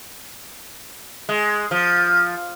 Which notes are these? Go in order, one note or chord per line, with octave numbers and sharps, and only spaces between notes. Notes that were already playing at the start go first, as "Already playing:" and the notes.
G#3
F3